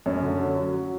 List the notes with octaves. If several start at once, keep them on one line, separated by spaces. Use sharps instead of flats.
F#2 C#4
D3
F#3
F#3
F#3